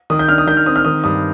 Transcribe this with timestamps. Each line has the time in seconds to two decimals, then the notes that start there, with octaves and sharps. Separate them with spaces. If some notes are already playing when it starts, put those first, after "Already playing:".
0.10 D#3 D#6
0.19 G6
0.29 D4 F6
0.38 D#6
0.47 D#3 G6
0.57 F6
0.66 C4 D#6
0.76 F6
0.85 D#3 D#6
1.04 G2 D#6